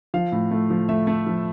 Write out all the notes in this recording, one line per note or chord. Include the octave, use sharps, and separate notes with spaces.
F3 F5
A2
A3
F3
A3 E5
A3
F3